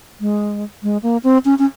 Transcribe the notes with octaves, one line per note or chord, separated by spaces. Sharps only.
G#3
G#3
A#3
C4
C#4
C#4